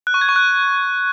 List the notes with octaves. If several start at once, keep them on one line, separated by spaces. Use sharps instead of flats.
F#6
C#6
G#6
C#6
F#6